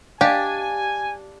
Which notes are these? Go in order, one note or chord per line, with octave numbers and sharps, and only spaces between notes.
D4 G4 D#5 F5 G#5